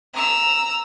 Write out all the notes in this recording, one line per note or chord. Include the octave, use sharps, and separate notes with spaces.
A#5 E6